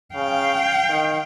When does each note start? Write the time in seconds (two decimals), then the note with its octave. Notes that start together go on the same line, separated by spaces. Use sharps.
0.15 C#3 F5 G5
0.89 D#3